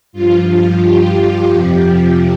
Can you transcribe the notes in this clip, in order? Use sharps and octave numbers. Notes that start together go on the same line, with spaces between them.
G2 F3 F4
G4
F2 C3 F3 G4